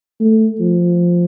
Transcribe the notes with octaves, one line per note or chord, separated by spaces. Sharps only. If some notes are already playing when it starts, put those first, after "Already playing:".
A3
F3